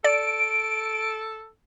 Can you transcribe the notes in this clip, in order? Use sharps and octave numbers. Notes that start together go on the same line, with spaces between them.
A4 D5 D7